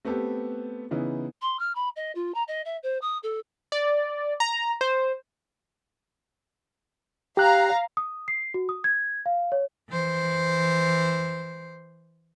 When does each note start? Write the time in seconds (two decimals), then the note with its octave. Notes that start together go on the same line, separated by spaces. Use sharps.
0.05 A3 B3 C4 G4 A4
0.91 C#3 E3 B3 D#4 E4
1.42 C6
1.59 F6
1.75 B5
1.96 D#5
2.15 F4
2.34 A#5
2.48 D#5
2.65 E5
2.83 C5
3.01 D#6
3.23 A4
3.72 D5
4.40 A#5
4.81 C5
7.37 G4 F5 A#5 F#6
7.97 D#6
8.28 C7
8.54 F#4
8.69 D#6
8.84 G#6
9.26 F5
9.52 C#5
9.89 E3 C5